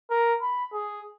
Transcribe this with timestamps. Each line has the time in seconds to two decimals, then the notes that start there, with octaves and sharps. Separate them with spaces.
0.10 A#4
0.42 B5
0.73 G#4